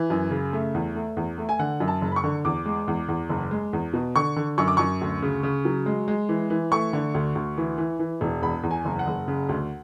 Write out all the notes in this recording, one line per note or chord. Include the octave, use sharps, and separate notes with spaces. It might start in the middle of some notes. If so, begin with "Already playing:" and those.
Already playing: E3
F#2
C#3
A3
E2
A3
E2
A3
G#5
D3 F#5
F#2
A5
F#1
B5
C#6
D3
E2 D6
G#3
E2
E2
F#1
G#3
E2
B2
D3 C#6
D3
F#2 C#6
D6
F#2 C#6
D2
C#3
C#3
F#3
G#3
G#3
E3
E3
A3 C#6
D3
D2
D2
E3
E3
E3
E1
E2 B5
E2
G#5
F#1
F#5
F#1
C#3
D2